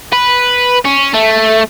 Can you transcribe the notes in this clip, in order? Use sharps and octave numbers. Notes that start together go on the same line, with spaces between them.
B4
C#4
A3